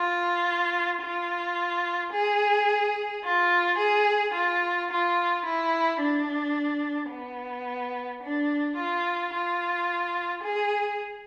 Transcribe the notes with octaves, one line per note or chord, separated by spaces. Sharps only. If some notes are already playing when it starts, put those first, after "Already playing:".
Already playing: F4
F4
G#4
F4
G#4
F4
F4
E4
D4
B3
D4
F4
F4
G#4